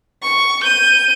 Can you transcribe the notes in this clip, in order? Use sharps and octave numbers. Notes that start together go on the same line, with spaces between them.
C#6
G6 D#7